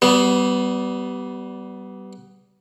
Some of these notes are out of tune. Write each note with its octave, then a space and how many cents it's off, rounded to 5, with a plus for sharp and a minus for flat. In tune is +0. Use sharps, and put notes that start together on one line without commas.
G3 -20 B3 +10